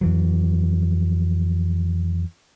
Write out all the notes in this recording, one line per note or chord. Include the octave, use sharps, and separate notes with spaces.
F2 E3 F#3